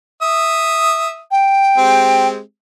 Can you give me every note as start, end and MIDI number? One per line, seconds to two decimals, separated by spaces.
0.22 1.21 76
0.22 1.21 87
1.31 2.27 79
1.77 2.40 56
1.77 2.40 60
1.77 2.40 67